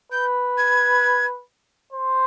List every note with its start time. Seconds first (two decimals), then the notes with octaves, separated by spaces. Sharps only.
0.12 B4 G6
0.58 G#6
1.92 C5